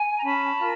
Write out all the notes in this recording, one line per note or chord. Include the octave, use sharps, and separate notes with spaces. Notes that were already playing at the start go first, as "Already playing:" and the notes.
Already playing: G#5
A#5
C#4 A5 B5
F4 A#4